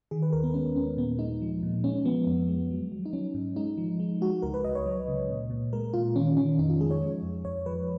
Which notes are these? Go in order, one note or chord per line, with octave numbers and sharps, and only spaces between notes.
D#3 G#4
B4
D#2 A#4
B3
G#3 C#4
D#2 C#4
A#2 B3
G#3 D#4
F3
A#2
G#3 C#4
F3 B3
F2
G#3
F#3
F#3
D#4
F#3 C#4
G#2
G#3 D#4
F3
G#3
G#3 F#4
C#2 A#4
B4
C#2 D#5
C#5
F#3
C#3
A#2
A#2
G#3 A#4
A#2 F4
D#3 C#4
D#3 C#4
F2 D#4
F4
G#3 G#4
C#5
F3
F2
F2 C#5
F3 B4